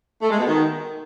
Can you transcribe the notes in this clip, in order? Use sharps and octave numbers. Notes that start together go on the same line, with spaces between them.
A3
G#3
B2
D#3